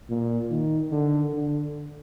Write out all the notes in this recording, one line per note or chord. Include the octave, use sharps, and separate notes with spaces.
A#2
D#3
D3
D3